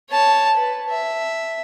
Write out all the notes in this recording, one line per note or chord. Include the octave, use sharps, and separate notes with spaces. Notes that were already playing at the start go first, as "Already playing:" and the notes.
C#5 A5
B4
E5